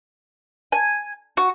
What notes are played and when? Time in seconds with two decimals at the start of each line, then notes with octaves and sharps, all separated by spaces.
0.72 G#5
1.37 F#4